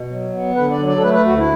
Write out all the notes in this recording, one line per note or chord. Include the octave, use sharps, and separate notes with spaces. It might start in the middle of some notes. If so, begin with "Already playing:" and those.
Already playing: B2
F#3
B3
D3 B4
D5
F#3
D5
A4
A3 B4
B4
D2 F#4
E4